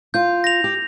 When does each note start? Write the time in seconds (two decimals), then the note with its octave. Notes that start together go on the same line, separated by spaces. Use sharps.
0.14 F4 G6
0.44 A#6 F7
0.64 G4